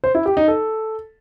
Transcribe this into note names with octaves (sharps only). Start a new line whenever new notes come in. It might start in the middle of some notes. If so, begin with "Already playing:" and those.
C5
E4
G4
D#4
A4